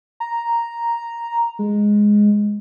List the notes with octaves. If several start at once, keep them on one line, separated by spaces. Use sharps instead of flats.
A#5
G#3